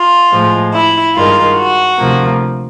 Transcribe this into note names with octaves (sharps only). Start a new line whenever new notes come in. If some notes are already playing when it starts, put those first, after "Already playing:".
Already playing: F4
A2 F3 G#3
E4
G2 D#3 G#3 F4
F#4
D2 C3 F3 A#3